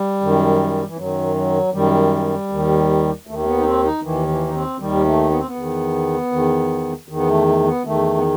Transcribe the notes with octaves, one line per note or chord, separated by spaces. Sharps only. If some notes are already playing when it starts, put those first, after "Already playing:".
Already playing: G3
F#2 D#3
E3
F#2 D#3 F#3
F#3
F#2 D#3 G3
D#2 D#3
D#2 D#3 A3
A3
B3
D#4
C4
D#4
D#2 D#3 E3
E3
D#4
C4
D#2 D#3 G3
A3
B3
C4
B3
E2 D#3
E2 D#3
E2 D#3
B3
A3
A3
A3
B3
E2 D#3 A3
B3